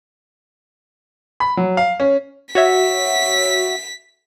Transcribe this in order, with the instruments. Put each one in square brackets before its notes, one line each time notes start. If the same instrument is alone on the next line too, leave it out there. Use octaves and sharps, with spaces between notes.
[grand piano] B5
F#3
F5
C#4
[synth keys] F#4 C#5 E5 [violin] B6